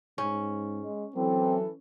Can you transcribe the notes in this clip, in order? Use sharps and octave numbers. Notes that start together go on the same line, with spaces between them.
G#2 C#4
G#3
E3 F#3 C4 A4